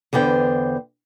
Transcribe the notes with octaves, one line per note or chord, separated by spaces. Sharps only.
E2 D3 B3 C5 G5